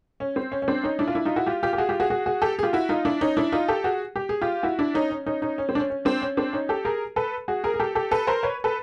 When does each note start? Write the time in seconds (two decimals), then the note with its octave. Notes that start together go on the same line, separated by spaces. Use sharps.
0.20 C#4
0.36 C4
0.52 C#4
0.62 C#4
0.68 C4 D4
0.83 C#4 D#4
0.99 D4 E4
1.08 F4
1.15 D4 E4
1.25 D#4 F4
1.36 E4 F#4
1.46 F4 G4
1.63 F4 G4
1.73 G4
1.78 F#4 G#4
1.89 F4 G4
2.00 F#4 G#4
2.10 F#4 G#4
2.26 F#4 G#4
2.42 G4 A4
2.59 G#4
2.63 F4 G4
2.73 E4 F#4
2.89 D#4 F4
3.05 D4 E4
3.21 C#4 D#4
3.37 D4 E4
3.52 D#4 F4
3.68 G4 A4
3.84 F#4 G#4
4.16 G4
4.29 G#4
4.42 F4 G4
4.63 E4 F#4
4.79 D4 E4
4.94 C#4 D#4
5.10 C#4
5.26 C#4 D#4
5.42 C#4 D#4
5.58 C#4
5.69 C4
5.75 D4
5.79 C#4
5.90 C#4
6.05 C4 D4
6.22 C#4
6.37 C4 D4
6.53 C#4 D#4
6.69 G4 A4
6.85 G#4 A#4
7.16 A4 B4
7.48 F#4 G#4
7.64 G#4 A#4
7.74 G#4
7.80 G4 A4
7.95 G4 A4
8.11 A4 B4
8.27 A#4 C5
8.43 B4 C#5
8.64 A4 B4